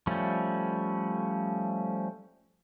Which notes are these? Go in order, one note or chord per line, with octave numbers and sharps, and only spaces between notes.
F3 G3 A3 C#4